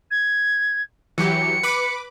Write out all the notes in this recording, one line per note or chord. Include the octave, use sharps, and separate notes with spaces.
G#6
E3 F#3 G4 C#7
B4 B5 D6